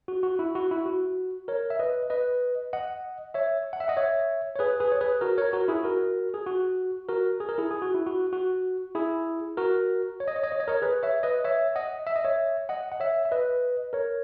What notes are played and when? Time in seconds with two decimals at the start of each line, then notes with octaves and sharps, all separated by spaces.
0.08 F#4
0.23 F#4
0.39 E4
0.55 F#4
0.71 E4
0.86 F#4
1.48 A#4 C#5
1.70 E5
1.79 B4 D#5
2.10 B4 D#5
2.73 D#5 F#5
3.34 C#5 E5
3.73 F#5
3.80 E5
3.88 D#5 F#5
3.97 C#5 E5
4.56 C#5
4.59 G#4 B4
4.80 G#4 B4
4.92 C#5
5.01 G#4 B4
5.21 F#4 A#4
5.38 A#4 C#5
5.53 F#4 A#4
5.68 E4 G#4
5.84 F#4 A#4
6.34 G#4
6.46 F#4
7.08 F#4 A#4
7.40 G#4
7.49 A#4
7.58 E4 G#4
7.71 G#4
7.82 F#4
7.94 E4
8.06 F#4
8.33 F#4
8.95 E4 G#4
9.57 F#4 A#4
10.20 C#5
10.28 D#5
10.36 C#5
10.43 D#5
10.52 C#5
10.60 D#5
10.68 A#4 C#5
10.82 G#4 B4
11.03 C#5 E5
11.23 B4 D#5
11.44 C#5 E5
11.76 D#5 F#5
12.07 E5
12.16 D#5
12.24 C#5 E5
12.69 D#5 F#5
12.92 F#5
13.00 C#5 E5
13.25 E5
13.32 B4 D#5
13.93 A#4 C#5